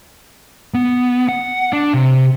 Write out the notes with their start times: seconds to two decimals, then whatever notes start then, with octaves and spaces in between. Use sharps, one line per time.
0.74 B3
1.29 F#5
1.73 D4
1.94 C3